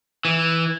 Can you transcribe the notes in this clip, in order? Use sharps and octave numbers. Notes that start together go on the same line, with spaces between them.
E3